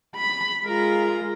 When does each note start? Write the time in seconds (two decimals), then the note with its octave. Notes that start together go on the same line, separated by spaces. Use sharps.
0.16 B5
0.64 G#3 F4 A#4 A#5